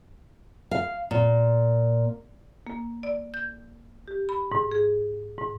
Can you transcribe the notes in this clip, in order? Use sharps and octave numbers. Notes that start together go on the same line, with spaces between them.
F5
A#2
A#3
D5
G6
G4
B5
G#2
G#4
G#2